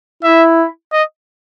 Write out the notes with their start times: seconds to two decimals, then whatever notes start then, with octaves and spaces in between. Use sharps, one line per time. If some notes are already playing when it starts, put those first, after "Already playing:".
0.23 E4 E5
0.92 D#5